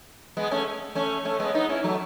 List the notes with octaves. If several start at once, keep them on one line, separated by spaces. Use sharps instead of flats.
G#3 B3
A3 C#4
A3 C#4
A3 C#4
G#3 B3
B3 D#4
C#4 E4
F#3 A3